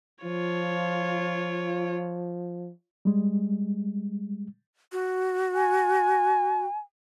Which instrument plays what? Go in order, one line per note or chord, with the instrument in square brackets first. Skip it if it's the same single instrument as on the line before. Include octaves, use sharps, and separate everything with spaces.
[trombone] F3 [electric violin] F4 C#5
[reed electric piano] G3 G#3
[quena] F#4
[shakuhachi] G#5